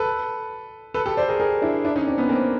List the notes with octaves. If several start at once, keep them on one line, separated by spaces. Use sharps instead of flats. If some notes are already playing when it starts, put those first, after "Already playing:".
Already playing: A4 B4
A4 B4
G4 A4
C5 D5
G#4 A#4
G#4 A#4
D4 E4
D4 E4
C#4 D#4
C4 D4
B3 C#4
A#3 C4